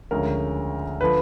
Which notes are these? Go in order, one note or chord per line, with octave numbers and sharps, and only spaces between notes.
D2 C#3 F3 G#3 C#4 A#4
D3 F3 B4